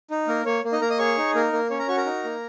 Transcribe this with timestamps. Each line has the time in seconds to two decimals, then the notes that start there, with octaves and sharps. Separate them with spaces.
0.11 D#4
0.27 A#3 A#4
0.46 A#3 C#5
0.64 A#3
0.72 D#4 D#5
0.81 A#3 A#4 A#5
0.90 D#5 D#6
0.99 G#4 C#5 C#6
1.17 D#4
1.35 A#3 A#4
1.53 A#3
1.70 C#4 C#5
1.79 A#4 A#5
1.88 F#4 C#5 C#6
1.97 A#4 A#5
2.06 D#4
2.24 A#3